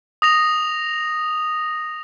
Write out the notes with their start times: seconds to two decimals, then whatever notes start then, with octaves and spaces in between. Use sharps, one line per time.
0.22 D#6 A#6 F7